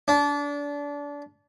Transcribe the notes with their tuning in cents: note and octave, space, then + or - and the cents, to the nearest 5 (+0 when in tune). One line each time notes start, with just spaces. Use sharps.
D4 -30